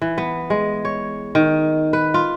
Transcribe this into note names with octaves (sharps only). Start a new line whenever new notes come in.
E3
B3
G#3
C#5
D#3
B4
F4